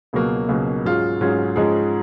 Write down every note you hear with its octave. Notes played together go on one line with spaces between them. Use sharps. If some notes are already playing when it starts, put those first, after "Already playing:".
C#2 B2 F#3 A#3
C#2 B2 F#3 A#3
G#2 F#3 C#4 F4 G#4
G#2 F#3 C#4 F4 G#4
G#2 F3 G#3 C#4 G#4